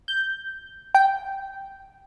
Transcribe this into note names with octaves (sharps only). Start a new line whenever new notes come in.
G6
G5